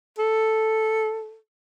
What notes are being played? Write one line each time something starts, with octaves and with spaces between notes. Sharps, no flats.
A4